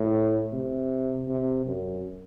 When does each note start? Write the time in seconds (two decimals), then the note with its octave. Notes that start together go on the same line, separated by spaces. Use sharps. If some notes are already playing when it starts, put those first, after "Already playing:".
Already playing: A2
0.52 C3
1.28 C3
1.66 F#2